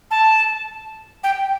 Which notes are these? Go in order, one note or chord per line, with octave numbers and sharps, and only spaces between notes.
A5
G5